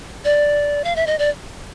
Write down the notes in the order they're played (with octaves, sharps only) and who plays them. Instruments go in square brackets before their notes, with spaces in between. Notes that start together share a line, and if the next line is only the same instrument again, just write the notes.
[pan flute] D5
F5
E5
D#5
D5